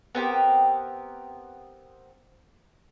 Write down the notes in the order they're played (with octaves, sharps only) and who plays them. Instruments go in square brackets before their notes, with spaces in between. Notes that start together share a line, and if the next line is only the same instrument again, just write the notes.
[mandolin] B3 C4 G4 A#4